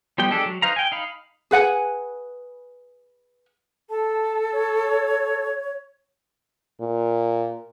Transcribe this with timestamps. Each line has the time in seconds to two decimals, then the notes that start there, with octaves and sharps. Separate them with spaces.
0.18 F3 G3 B3 G5
0.31 G#3 D4 G4 A4
0.46 F#3
0.62 D#4 B4 C5 F5 A#5
0.76 G5 G#5
0.92 D#4 F5 B5
1.51 G#4 B4 F#5 G#5
3.90 A4 A5
4.52 C#5
6.80 A#2